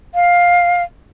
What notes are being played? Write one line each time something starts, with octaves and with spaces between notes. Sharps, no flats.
F5